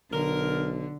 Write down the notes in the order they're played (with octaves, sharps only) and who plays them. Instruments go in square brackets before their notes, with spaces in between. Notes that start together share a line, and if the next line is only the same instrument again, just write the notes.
[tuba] B1 [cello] D3 [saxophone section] A#4